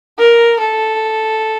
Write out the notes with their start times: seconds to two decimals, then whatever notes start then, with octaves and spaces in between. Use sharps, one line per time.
0.18 A#4
0.60 A4